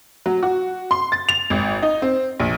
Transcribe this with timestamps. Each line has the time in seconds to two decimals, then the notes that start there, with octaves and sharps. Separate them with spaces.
0.26 F#3
0.43 F#4
0.91 C6
1.12 A6
1.29 F7
1.50 G#1
1.82 D#4
2.02 C4
2.40 A#1